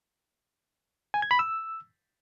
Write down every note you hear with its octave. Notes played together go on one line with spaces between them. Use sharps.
G#5
G#6
B5
E6